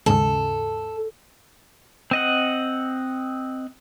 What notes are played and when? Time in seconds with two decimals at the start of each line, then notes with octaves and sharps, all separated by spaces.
0.06 D#2 G#2 C#3 A4
2.11 C4 D#5 F#5